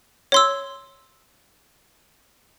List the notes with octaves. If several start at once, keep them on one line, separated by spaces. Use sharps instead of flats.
C#5 C6 E6